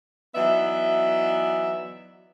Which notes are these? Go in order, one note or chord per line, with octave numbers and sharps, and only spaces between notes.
E3 F#3 B3 D#4 D5 E5